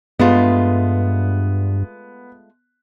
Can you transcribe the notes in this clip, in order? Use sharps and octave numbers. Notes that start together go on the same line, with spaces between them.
G2 G#3 A3 B3 F4